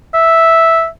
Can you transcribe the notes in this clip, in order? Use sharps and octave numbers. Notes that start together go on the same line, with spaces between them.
E5